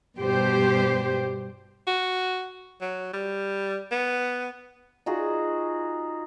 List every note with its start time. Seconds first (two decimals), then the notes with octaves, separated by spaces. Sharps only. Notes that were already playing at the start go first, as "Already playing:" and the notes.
0.19 G2 B2 G3 G4 C5
1.87 F#4
2.81 F#3
3.13 G3
3.91 B3
5.06 D#4 F4 F#4 G#4